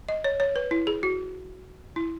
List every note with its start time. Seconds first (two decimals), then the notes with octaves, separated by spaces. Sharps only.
0.09 D#5
0.24 C#5
0.40 C#5
0.56 B4
0.71 E4
0.87 G#4
1.03 F#4
1.96 E4